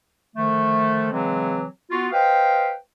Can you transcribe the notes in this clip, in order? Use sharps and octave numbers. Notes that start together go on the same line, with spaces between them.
D3 D#3 F3 A3
C#3 E3 F#3 G#3 C4
B3 F4 F#4
B4 C5 D#5 F5 G5